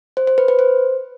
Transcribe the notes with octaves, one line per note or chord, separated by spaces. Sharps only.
C5
C5
B4
B4
C5